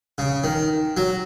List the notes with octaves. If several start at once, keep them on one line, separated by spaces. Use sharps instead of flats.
C#3
D#3
F#3